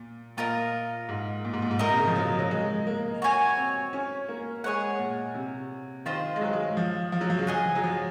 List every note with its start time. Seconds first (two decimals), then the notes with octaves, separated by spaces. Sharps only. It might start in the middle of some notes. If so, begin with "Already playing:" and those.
Already playing: A#2
0.37 A#2 F4 A#4 D#5
1.09 G#2
1.45 A#2
1.53 G#2
1.62 A#2
1.71 G#2
1.79 A#2 D#4 A#4 D#5
1.88 C3
1.97 C#3
2.07 F3
2.16 F#3
2.39 F#3
2.51 G#3
2.87 A#3
3.22 F#4 C#5 G#5
3.57 C4
3.93 C#4
4.29 A#3
4.64 G#3 G#4 C#5 F#5
4.99 A#2
5.35 C3
6.06 D#3 F4 C5 D#5
6.36 G#3
6.41 F#3
6.53 G#3
6.77 F3
7.12 F3
7.21 F#3
7.30 F3
7.38 C#3
7.47 G#4 D#5 F#5
7.75 F#3
7.83 F3